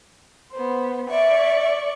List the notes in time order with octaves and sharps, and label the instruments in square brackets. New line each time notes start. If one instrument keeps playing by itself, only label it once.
[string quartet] B3 C5
[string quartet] D5 C#6 [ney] E5